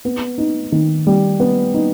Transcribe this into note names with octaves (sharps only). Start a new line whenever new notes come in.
B3
D#4
D#3
G3
B3
D#4